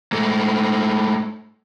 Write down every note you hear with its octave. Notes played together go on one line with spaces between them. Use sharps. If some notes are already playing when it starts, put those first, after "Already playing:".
G#2 A3